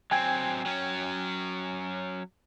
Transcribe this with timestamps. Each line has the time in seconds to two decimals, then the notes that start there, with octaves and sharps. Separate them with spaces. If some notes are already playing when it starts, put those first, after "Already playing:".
0.11 F#3 C4 G5 G#5 G#6
0.66 F#3 C#4